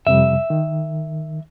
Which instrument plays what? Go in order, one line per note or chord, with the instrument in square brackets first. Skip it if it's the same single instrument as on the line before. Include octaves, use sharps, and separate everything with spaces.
[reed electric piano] F2 C3 G3 [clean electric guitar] E5
[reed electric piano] D#3